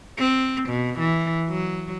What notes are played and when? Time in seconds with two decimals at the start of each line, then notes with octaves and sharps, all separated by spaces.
0.18 C4
0.69 B2
0.99 E3
1.49 F#3